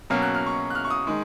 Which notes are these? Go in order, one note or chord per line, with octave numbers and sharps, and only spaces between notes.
B2 F#3 A#3 C#4 F6
F#6
F6
C#6
F#6
F6
C#6
D#6
D#3 G#3